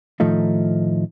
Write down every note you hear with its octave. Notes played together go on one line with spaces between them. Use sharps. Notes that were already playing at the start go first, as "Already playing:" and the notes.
A2 D#3 F3 A3 D#4